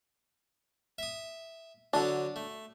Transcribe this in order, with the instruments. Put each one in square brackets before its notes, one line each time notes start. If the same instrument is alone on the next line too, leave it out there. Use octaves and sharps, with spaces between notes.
[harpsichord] E5 D#6
[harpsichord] D3 F#3 D#6 [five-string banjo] D4 A4
[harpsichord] A3